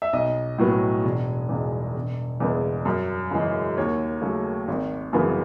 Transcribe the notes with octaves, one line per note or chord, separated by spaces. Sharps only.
E5
B1 D#5
A2 F#3 B3
E1
E2 C#3 G#3
E1
E2 C#3 G#3 B3
F#2
C#3 E3 G#3
D#2 C#5
C#3 F#3 A3
G#1
F#2 C#3 E3 B3